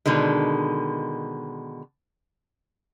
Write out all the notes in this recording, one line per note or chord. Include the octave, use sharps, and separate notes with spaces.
B2 D3 D#3 G#3